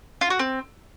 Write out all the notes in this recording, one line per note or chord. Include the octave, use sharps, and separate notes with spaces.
F4
F#4
C4